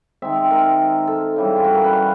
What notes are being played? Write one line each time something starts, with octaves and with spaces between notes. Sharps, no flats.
D#3 G#3 C4 E5
A#4
A4
C#3 E3 G3
F4
F#4
A#4
B4
F5